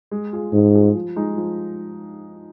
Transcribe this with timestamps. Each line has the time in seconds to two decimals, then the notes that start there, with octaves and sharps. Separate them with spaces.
0.11 G#3
0.33 F4 G#4
0.53 G#2 G#3
0.75 F4 G#4
0.95 F3
1.16 G#3 D#4
1.37 F3